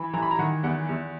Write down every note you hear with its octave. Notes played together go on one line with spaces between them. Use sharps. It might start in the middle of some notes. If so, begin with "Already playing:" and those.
Already playing: E3 B5
E3 A#5
B5
A#5
D#3 F#5
E2 F#5
E2